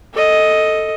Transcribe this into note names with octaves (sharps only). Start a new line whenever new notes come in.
A4 D#5